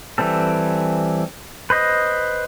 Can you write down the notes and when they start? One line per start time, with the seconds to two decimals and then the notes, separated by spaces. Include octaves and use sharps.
0.18 E3 G3 C4 A4
1.70 B4 C5 D#5